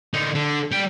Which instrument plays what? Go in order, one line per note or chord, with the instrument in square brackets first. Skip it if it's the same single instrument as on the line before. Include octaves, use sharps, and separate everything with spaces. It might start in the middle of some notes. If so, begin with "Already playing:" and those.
[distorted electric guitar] D3 D#4
D3
G3 G5